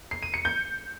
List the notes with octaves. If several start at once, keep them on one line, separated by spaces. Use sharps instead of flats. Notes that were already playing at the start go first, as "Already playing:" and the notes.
C7
D#7
C#7
G6